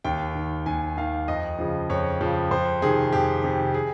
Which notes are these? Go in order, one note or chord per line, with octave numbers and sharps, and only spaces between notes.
D#2 G5
D#3
D#2 G#5
D#3 F5
F2 D#5
C#3 F3
F2 C#5
C#3 F3
F2 C5
C3 D#3 G#4
F2 G4
C3 D#3
G#4